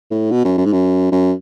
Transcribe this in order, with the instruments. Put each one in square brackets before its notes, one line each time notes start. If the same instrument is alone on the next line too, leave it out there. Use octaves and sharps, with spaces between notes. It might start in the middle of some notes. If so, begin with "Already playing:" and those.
[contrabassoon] A2
B2
F#2
F#2
G#2
F#2
F#2